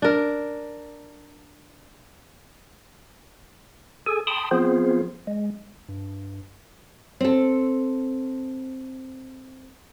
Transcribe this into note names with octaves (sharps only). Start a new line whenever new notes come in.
D4 A#4
G#4 A4 G#5
G5 A5 B5 C6 D#6
F3 B3 C4 F4 G#4 C5
G#3
G2
C4 A4